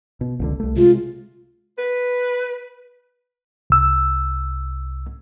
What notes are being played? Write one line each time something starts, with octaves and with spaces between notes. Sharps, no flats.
B2
F1 C#2 D3
C2 A3
C3 G#3 F4
B4
C2 E6